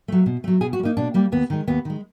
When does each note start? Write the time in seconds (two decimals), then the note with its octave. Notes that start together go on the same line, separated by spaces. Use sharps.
0.08 F#3 A3
0.26 B2
0.44 F#3 A3
0.61 B2 G#4
0.73 F#4
0.79 G3
0.83 A#3 D#4
0.97 B2 D4
1.14 G3 A#3
1.32 D#2 B3
1.50 D#3 G#3
1.67 D#2 B3
1.85 D#3 G#3